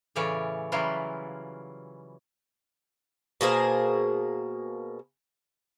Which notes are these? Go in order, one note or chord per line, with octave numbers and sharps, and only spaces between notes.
A2 C#3 E3 C#4 C#5 D5
C#3 E3 F#3 G3 E4 F4
B2 A#3 G#4 C5